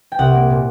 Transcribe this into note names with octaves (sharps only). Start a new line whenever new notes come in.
G5
C2 F#5
A#3
A#2